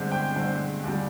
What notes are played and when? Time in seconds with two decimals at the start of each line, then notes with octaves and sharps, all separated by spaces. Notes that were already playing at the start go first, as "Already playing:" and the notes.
Already playing: G2 D3 G#3 C4
0.12 G5
0.36 G2 D3 G#3 C4
0.84 D#2 D3 G3